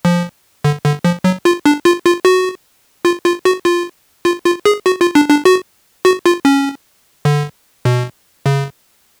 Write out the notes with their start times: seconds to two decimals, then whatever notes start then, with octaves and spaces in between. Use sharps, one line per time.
0.05 F3
0.64 D3
0.85 D3
1.04 F3
1.24 F#3
1.45 F4
1.66 D4
1.85 F4
2.06 F4
2.25 F#4
3.05 F4
3.26 F4
3.45 F#4
3.65 F4
4.25 F4
4.45 F4
4.65 G#4
4.86 F#4
5.01 F4
5.15 D4
5.30 D4
5.45 F#4
6.05 F#4
6.26 F4
6.45 C#4
7.25 D3
7.85 B2
8.46 C#3